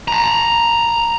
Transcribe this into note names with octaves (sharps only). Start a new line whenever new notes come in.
A5 A#5